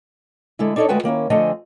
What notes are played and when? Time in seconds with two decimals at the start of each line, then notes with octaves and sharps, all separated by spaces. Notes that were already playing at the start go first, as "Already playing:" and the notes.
0.59 D3 G#3 E4
0.76 D4 D#4 A4 A#4 C#5 D5
0.88 D2 G#3 F4 F#4 B4 G5
1.03 D#3 A#3 C#4 E4
1.30 D3 F3 A3 C4 D#5 G#5